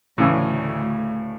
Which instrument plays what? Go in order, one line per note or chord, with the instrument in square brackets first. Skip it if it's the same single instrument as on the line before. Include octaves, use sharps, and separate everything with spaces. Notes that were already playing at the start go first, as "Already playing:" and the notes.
[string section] D2 [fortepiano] A2 C#3 E3